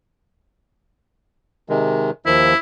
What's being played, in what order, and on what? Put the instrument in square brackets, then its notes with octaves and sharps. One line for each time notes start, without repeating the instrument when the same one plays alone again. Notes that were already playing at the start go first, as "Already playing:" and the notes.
[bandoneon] C3 D#3 G#3
[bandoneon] D#2 D#3 F3 [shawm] E4